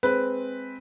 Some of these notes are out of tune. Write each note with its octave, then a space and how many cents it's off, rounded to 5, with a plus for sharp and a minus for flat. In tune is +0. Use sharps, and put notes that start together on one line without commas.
G#3 +0 C4 -5 B4 +0